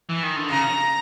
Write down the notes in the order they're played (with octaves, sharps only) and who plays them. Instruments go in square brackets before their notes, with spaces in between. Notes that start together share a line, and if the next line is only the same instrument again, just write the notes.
[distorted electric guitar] E3
D#3
D3
[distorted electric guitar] C#3 [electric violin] A#5